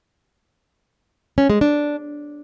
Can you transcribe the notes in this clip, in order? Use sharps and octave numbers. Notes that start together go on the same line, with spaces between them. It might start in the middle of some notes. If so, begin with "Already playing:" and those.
C#4
G#3
D4